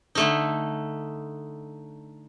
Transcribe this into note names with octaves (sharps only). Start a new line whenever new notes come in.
D3 A3 D#4